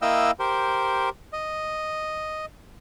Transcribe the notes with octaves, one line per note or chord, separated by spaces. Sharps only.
A#3 E4 D#5 F5 G5 E6
G4 A#4 C5
D#5